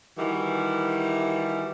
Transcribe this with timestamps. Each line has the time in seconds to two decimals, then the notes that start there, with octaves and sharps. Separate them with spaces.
0.18 D#3 E3 G3 F#4